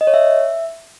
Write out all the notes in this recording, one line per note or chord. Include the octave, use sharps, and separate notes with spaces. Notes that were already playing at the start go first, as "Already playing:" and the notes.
D#5
C#5
E5